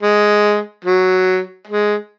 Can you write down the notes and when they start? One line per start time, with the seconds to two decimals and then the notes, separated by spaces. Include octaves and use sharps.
0.02 G#3
0.85 F#3
1.67 G#3